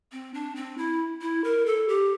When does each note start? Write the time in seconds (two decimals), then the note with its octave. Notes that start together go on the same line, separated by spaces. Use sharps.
0.12 C4
0.34 D4
0.55 C4
0.78 E4
1.21 E4
1.44 A#4
1.66 A4
1.89 G4